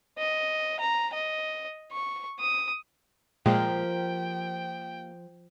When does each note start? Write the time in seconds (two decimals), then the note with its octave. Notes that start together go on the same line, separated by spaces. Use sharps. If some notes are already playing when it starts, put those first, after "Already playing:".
0.18 D#5
0.80 A#5
1.14 D#5
1.92 C#6
2.40 D#6
3.46 A#2 F3 G#3 A#3 G4 A#4 G5